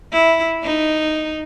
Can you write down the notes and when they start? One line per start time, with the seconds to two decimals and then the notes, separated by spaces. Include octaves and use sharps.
0.12 E4
0.63 D#4